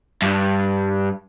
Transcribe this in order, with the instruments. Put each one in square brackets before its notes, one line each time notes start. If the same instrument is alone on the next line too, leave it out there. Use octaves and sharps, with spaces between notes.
[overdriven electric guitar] G2